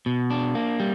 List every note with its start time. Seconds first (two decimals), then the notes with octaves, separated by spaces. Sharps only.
0.06 B2
0.30 D4
0.55 A#3
0.80 G3